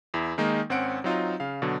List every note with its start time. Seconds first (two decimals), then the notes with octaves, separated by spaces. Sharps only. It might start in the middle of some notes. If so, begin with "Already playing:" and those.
0.14 E2 E4
0.38 D#3 G#3 A#3 D#4
0.70 G#1 C4 C#4 F#5 D7
1.04 F#3 C4 D#4 F4
1.40 C#3 F5
1.62 B2 D3 F#3